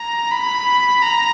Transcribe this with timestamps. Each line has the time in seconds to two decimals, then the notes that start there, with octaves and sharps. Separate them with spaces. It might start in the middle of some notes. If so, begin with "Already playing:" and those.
Already playing: A#5
0.32 B5
1.02 A#5